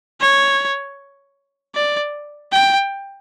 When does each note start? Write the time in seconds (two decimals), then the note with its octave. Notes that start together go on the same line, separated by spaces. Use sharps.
0.21 C#5
1.75 D5
2.52 G5